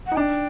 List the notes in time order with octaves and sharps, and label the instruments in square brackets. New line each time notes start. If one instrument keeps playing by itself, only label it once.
[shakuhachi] F#5
[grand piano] D#4
[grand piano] D4 [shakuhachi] G5 A#5